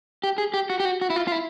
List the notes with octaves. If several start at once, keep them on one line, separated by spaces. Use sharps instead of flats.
G4
G#4
G4
F#4
G4
F#4
F#4
E4
F4
F4
E4